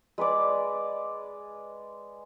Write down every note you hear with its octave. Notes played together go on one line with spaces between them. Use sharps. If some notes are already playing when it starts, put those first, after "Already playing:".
G#3 B4 D5 D6